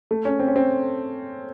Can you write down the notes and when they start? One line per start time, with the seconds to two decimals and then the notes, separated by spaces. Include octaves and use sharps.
0.11 A3
0.25 C#4
0.39 C4
0.48 C#4
0.56 C4